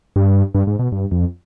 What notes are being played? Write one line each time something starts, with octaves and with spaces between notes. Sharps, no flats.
G2
G2
G#2
B2
G2
F2